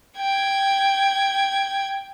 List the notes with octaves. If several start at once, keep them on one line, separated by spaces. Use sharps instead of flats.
G5 G#6